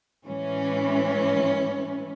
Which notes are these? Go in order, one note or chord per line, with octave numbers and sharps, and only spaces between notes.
A2 E3 G#3 C#4